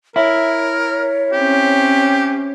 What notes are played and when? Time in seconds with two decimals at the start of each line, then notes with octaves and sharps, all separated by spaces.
0.16 E4 A#4 C#5 E5
1.32 C4 C#4 G4